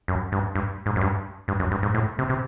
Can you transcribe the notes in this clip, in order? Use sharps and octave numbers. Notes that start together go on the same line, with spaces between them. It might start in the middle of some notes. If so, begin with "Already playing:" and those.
F#2
G2
G2
G#2
F#2
G2
G2
F#2
G2
G#2
A2
C3
C3